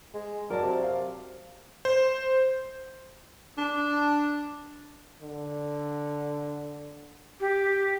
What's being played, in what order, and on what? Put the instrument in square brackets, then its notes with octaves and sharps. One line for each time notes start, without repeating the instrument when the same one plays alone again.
[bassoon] G#3
[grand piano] F#3 D5 A5 [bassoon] A#4
[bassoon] C3
[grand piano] F5
[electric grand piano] C5
[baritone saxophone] D4
[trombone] D3
[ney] G4